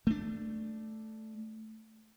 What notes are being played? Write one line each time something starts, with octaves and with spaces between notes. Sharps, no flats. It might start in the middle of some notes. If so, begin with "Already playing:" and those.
A3 D4